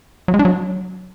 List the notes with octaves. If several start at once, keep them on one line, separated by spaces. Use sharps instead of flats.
F#3
G#3
D4
F#3